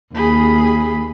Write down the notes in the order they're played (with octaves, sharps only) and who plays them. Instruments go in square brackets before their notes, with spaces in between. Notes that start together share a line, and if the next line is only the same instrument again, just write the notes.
[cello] D#2 [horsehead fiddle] G#4 B5